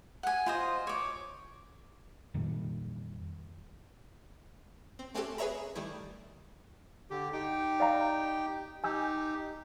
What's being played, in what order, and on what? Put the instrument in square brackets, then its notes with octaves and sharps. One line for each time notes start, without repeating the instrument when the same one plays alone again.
[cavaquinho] F#5 G#5
F4 C5 D#5
C#5 D6
[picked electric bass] F2 A#2 D#3 G3
[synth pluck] C4
A3 C4 C#4 F#4 G4 A4
G#4 B4 C#5 E5 A#5 B5
D#3 G3 A3 E4
[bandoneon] D3 G4
D#4 G4 G5
[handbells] D5 F5 A#5
[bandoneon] D#4 G4 [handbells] G#5 E6 G6